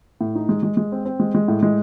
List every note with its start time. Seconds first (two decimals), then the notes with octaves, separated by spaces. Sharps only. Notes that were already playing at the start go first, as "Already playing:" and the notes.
0.21 A2
0.35 D#4
0.49 G#3
0.63 G#3
0.77 G#3
0.92 C4
1.05 C4
1.20 G#3
1.35 G#3
1.48 A2
1.63 G#3